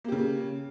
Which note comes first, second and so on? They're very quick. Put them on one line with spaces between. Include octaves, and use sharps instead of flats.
A#3 G4 C#3